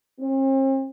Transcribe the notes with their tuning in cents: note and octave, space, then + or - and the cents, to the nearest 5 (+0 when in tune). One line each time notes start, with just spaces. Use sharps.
C4 +45